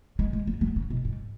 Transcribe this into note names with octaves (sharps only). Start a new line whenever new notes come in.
G#3
G#3
F#3
F#3
C#3
B2
G#2